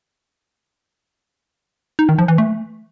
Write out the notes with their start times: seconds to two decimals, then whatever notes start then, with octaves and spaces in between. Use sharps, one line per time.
1.99 D#4
2.09 D#3
2.19 F3
2.28 E3
2.38 A3